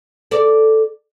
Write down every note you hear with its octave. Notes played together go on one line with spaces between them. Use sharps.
A4 D5